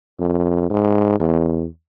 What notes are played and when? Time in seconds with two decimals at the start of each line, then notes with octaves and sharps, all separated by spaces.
0.20 F2
0.70 G#2
1.20 E2